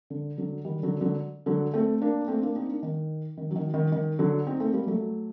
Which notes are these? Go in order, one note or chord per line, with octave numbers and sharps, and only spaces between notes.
D3
D3 F#3
D#3 G3
D3 F#3
D3 F#3
D3 F#3
A3 C4
A#3 D4
A3 C4
A#3 D4
C4 D#4
A#3 D4
D#3
D#3
F#3
D#3
D#3
D#3
D3 F#3
C4 D#4
A3 C4
G3 A#3
F#3 A3